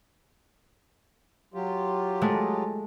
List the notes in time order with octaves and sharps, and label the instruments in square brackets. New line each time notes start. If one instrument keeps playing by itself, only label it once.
[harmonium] F#3 F4 G4
[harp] G#3 A3